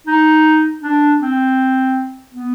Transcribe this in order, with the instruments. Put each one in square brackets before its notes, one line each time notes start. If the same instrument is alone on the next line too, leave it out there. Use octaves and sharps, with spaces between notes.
[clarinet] D#4
D4
C4
B3